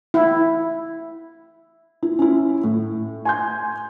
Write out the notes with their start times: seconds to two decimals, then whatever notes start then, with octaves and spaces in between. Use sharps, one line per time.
0.14 E4
2.02 E4
2.19 C#4 E4
2.64 A2
3.25 G#5 C6 G6